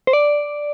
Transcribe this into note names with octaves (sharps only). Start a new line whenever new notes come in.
C5
D5